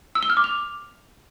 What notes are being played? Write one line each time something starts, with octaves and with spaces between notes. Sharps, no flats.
E6
G7
F6
D6
F7